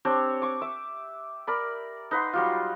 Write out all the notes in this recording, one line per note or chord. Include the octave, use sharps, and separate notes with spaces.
C4 D4 G4 C#5
C#6 D6
E5 D6
A#4 D5 B5
D#4 B4 F#5 C6
F#3 G3 F4